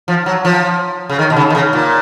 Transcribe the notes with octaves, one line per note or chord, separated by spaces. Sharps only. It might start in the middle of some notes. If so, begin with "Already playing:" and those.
F3
F#3
F3
C#3
D#3
B2
C#3
D#3
C#3
A#2